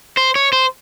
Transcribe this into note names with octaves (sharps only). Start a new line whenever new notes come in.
C5
C#5
C5